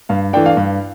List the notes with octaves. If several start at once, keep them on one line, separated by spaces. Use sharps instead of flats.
G2 F5
E3 A3 D4 G5
F5
G2